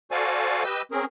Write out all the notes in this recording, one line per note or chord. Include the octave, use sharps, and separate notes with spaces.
F#4 A4 C5 D5 F5 G#5
G4 B4 D#5 E6 G6
C4 C#4 G#4 A#4